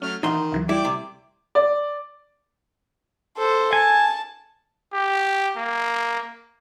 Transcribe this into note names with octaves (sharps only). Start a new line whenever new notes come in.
F#3 A3 C#4 F6
D#3 E3 D#4 A#4 E5 F#5 C6
C#2 E3 F#3
G3 E4 D5 G5 D6
C3
D5
A4 C5
G#5 A5
G4
A#3